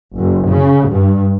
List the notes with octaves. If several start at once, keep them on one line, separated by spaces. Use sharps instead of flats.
F#1
C#3
G2